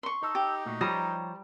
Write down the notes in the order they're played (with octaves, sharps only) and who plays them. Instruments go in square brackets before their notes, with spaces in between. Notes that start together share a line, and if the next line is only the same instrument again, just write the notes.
[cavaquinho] C6 C#6
[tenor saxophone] D#4 [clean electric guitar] A4
[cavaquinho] G4
[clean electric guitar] A#2 A3 F#4
[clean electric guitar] F3 G4 C#5 [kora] G3 [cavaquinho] C5 A#5 D#6